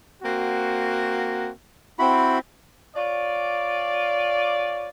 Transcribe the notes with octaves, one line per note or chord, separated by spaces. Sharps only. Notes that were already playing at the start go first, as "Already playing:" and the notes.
A#3 C4 F#4
C4 E4 F#4 B5
F4 C#5 D5